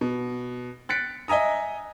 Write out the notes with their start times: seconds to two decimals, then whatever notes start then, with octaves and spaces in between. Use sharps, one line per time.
0.01 B2
0.89 F#6 A6 B6 C#7 D7
1.28 D#5 E5 G#5 A#5 D#6